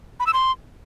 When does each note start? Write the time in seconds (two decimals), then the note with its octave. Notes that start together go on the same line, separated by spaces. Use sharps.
0.20 B5
0.27 E6
0.33 C6